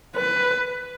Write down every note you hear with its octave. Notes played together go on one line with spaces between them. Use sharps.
B4